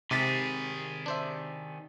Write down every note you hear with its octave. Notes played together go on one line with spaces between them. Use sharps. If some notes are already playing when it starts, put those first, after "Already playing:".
G#2 C3 D#3 G4 G#4 G5 A6 B6
D4 C5 E5